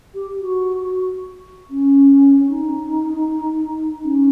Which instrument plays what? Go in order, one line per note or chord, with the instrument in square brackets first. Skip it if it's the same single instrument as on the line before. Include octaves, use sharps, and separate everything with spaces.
[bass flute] G4
F#4
C#4
D#4
C#4